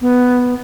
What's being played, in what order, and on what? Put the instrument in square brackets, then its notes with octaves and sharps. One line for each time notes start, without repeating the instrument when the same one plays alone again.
[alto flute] B3